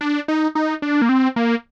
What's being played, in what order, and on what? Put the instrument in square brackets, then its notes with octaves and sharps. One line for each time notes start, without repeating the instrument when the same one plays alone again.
[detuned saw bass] D4
D#4
D#4
D4
A#3
C4
A#3